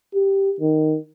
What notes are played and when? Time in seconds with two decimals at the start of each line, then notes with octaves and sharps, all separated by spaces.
0.15 G4
0.60 D#3